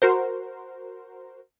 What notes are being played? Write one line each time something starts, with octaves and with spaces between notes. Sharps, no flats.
F#4 A#4 C5